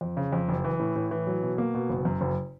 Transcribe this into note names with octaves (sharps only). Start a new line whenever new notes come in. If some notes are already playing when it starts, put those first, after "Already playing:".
F2
C#3
F2
F#1
E3
A2
A2
E3
F#3
B2
A#3
B2
F#1
F#2
F#1